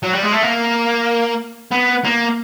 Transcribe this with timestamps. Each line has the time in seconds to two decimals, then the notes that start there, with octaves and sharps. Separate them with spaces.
0.03 F#3
0.13 G3
0.23 G#3
0.33 A3
0.43 A#3
1.72 B3
2.05 A#3